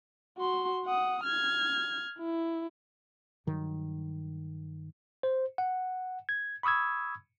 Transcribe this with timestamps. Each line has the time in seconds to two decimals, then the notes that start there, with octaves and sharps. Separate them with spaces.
0.38 F#4 C6
0.86 F#5 D#6
1.24 F6 G#6
2.19 E4
3.47 G2 D#3 F#3
5.23 C5
5.58 F#5
6.29 G#6
6.63 B5 C#6 D#6 E6 G#6